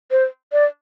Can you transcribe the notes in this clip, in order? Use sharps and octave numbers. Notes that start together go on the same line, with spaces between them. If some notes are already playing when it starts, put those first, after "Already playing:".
C5
D5